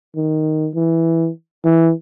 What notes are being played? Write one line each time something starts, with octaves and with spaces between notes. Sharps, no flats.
D#3
E3
E3